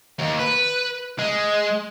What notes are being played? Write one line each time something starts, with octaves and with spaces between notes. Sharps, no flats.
D#2
B4
G#3